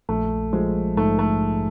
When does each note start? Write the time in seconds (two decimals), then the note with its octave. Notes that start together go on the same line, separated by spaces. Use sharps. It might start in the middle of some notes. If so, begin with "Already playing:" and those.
0.09 A#1 A3
0.53 F3 G#3
0.97 G#2 A3
1.19 A3